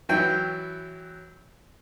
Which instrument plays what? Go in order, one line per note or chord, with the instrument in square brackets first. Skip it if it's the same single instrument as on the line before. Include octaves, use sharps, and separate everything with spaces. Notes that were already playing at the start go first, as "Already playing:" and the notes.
[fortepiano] E3 F#3 E4 G5